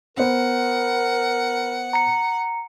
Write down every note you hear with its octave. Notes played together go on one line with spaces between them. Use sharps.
B3 A#4 C5 F#5
A#5 C#7